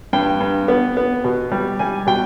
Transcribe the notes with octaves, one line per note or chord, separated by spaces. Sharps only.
G2 G5
G2
B3
B3
B2
G3
G3 G#5
B2 G5